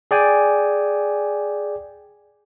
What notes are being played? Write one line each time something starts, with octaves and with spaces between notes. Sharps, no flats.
G#4 D5 G5 G#5